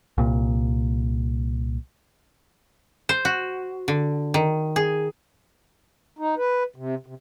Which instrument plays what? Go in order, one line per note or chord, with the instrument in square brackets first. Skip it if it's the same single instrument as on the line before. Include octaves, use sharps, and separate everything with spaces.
[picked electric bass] C2 A#2
[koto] C5
F#4
D3
D#3
G#4
[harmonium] D#4
B4
C3
C3